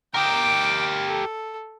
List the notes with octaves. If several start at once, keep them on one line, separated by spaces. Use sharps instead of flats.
G4 A#4 G5 D6
A4